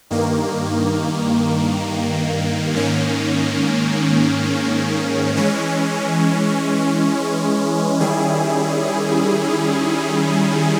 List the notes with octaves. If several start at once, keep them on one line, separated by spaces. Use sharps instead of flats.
G2 D#3 A#3
G#2 D#3 A#3 C#4
E3 G#3 C#4
D#3 G3 C#4 E4 G#4